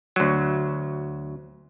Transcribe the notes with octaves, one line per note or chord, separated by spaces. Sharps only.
D2 F#3